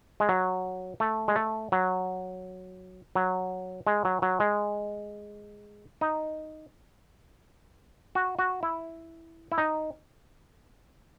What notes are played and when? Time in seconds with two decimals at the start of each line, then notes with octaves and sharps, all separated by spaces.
0.20 G#3
0.29 F#3
1.00 A3
1.28 G#3
1.36 A3
1.72 F#3
3.15 F#3
3.87 G#3
4.05 F#3
4.22 F#3
4.40 G#3
6.01 D#4
8.15 F#4
8.39 F#4
8.63 E4
9.52 E4
9.58 D#4